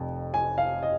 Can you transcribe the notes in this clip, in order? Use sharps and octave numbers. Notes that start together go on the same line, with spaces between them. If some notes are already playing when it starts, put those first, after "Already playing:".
Already playing: F1 F2
G#5
F5
D#5